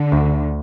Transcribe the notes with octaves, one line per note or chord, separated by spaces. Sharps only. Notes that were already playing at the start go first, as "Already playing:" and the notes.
Already playing: D3
D2